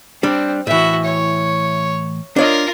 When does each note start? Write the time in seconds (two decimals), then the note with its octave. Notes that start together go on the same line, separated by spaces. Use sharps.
0.23 G3 C4 D4
0.67 A2 E3 F#4 E5
1.05 C#5
2.36 D4 F4 A#4 C#5 D#5